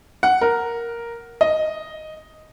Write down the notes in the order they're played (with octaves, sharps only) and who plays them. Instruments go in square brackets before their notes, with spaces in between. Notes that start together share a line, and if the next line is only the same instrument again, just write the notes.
[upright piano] F#5
A#4
D#5